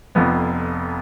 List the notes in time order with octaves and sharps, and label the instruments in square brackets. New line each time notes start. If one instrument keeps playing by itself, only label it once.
[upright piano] F1 F2 F3 B3